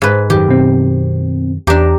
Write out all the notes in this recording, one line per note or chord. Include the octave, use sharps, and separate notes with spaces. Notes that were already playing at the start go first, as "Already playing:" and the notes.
G#2 B4
F#2 D#3 G4
B2 C4
E2 D4 G4 A#5